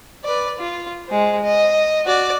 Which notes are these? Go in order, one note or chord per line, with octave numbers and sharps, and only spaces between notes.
B4 D5
F4
G#3 C5
D#5
F#4 D5